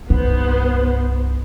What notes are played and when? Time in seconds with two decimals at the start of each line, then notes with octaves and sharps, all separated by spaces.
0.10 C2 G2 B3 D#4 C5